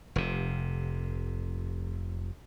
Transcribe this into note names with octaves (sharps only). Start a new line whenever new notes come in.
F1 C3